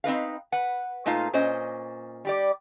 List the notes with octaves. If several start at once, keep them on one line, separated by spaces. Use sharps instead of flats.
C4 D#4 B4 F5
B4 F#5
A#2 A3 D#4 F4 F5
A#2 C#4 C5 D#5
G3 G4 D5